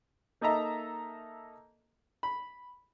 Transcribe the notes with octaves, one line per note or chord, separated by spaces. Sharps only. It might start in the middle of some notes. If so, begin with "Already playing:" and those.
A#3 D#4 A4 D#5 E5 A#5
B5